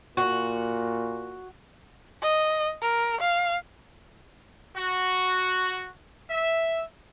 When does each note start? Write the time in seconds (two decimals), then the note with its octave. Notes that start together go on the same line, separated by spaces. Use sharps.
0.17 A#2 F#4
2.23 D#5
2.82 A#4
3.21 F5
4.75 F#4
6.30 E5